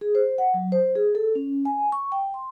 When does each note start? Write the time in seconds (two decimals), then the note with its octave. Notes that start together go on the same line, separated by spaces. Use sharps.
0.01 G#4
0.15 C5
0.38 F#5
0.54 F#3
0.72 C5
0.95 G#4
1.15 A4
1.35 C#4
1.65 G#5
1.92 C#6
2.12 G5
2.34 C6